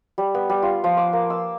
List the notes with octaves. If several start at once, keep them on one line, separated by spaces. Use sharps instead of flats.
G3
B3
G3
F4
F3
D6
A#3
E6